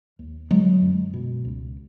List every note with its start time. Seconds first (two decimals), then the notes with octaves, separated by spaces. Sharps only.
0.19 D#2
0.51 D3 F#3 G#3
0.82 F#2
1.14 B2
1.45 C#2